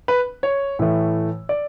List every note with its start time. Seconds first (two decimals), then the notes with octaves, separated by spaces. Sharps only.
0.08 B4
0.43 C#5
0.79 A2 E3 A3
1.49 D5